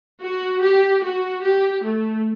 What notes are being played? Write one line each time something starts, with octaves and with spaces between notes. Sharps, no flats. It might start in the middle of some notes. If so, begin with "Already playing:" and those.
F#4
G4
F#4
G4
A3